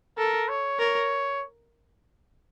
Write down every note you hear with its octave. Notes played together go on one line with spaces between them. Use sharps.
A4 A#4
C#5
A#4 C#5